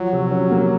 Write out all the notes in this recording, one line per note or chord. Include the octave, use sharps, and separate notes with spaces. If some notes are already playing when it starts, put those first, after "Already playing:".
Already playing: F3 F#3
C3
C#4
A#3